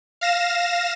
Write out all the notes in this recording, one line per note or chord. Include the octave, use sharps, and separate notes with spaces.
F5 A#6 E7